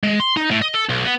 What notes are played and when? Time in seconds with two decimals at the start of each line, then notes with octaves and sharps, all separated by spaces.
0.03 G#3
0.20 C6
0.37 D#4
0.51 A2
0.62 D#5
0.74 A4
0.89 B1
1.05 B3